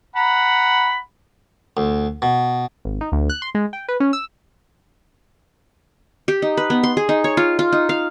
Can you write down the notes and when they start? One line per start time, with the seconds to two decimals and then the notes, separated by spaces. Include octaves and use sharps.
0.16 F#5 A#5 B5
1.77 D2
2.22 B2
2.85 G#1
3.01 D#4
3.12 D2
3.30 F#6
3.42 C6
3.55 G#3
3.73 G5
3.88 B4
4.00 C#4
4.13 E6
6.28 G4
6.42 D#4
6.57 B4
6.70 B3
6.83 C6
6.97 G#4
7.09 D#4
7.24 C#5
7.37 F4
7.59 F4
7.72 D#4
7.89 F5